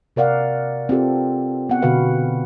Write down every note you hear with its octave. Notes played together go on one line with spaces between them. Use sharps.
C3 A#4 D5 F5 F#5
C4 F4 G4 A4
B3 F#5
B2 D3 F#4 B4 F5